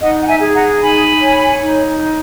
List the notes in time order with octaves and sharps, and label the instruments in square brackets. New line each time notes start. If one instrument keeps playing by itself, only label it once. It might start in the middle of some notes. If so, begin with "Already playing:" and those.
[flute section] D#4 D#5 F#5
F#5
E5 G#5
G#4
F#5 A#5
D#4 G#5 B5
C#5
D#4